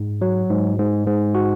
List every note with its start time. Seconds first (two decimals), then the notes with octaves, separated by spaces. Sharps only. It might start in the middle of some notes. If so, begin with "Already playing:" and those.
Already playing: G#2
0.21 F#3
0.50 G#2
0.78 G#2
1.07 G#2
1.35 F#4